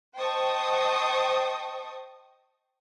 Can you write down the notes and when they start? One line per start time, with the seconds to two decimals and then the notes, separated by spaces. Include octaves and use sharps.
0.16 C5 D#5 G5 A5 C#6 D#6